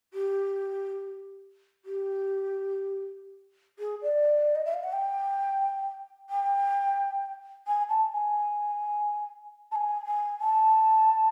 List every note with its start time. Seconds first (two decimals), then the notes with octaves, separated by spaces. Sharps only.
0.13 G4
1.85 G4
3.79 G#4
4.02 D5
4.55 D#5
4.65 E5
4.73 F5
4.83 F#5
4.92 G5
6.29 G5
7.67 G#5
7.89 A5
8.12 G#5
9.71 A5
9.75 G#5
10.05 G#5
10.40 A5